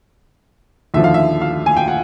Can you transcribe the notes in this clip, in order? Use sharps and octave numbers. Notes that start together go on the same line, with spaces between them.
D#2 D3 F3 E5
F5
E5
F5
G#5
G5
F#5